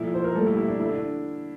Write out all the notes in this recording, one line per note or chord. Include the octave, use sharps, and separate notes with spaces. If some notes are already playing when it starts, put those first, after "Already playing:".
Already playing: A#2 F3 A3 E4
C5
A#4
A2 G3 A#3 A4
E4 G4
E4
D4
D3 A3 E4
D4